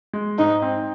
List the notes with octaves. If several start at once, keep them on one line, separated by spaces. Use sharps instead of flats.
G#3
G#2 D#4
C4